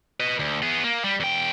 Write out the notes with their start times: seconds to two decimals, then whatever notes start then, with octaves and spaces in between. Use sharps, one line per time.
0.20 B4 D#5
0.39 D2
0.62 B3 G#4
0.84 A#3
1.04 G3
1.20 E2 G5